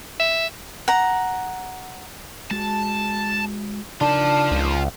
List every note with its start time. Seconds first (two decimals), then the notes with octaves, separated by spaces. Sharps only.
0.19 E5
0.88 F#5 A#5
2.51 G#3 F#4 G#4 A5
4.01 C#3 D4 D#4 F4 A#4 A5
4.51 C#2